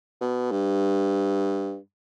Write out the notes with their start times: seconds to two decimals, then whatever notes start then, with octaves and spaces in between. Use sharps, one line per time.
0.21 B2
0.51 G2